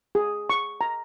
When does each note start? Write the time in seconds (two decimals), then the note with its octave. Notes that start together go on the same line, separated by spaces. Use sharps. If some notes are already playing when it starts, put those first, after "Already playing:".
0.15 G#4
0.50 C#6
0.81 A#5